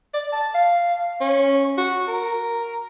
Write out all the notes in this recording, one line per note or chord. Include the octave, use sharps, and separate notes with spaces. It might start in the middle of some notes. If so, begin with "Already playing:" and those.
D5
A5
F5
C#4
F#4
A#4